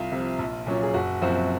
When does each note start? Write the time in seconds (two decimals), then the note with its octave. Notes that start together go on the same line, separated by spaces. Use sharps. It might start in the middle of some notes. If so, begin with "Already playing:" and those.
Already playing: C2 F4
0.12 C3 F3
0.39 A#1
0.67 A#2 F#3 C#4
0.83 G#4
0.94 F#1 F#4
1.22 F#2 F3 C4 F#4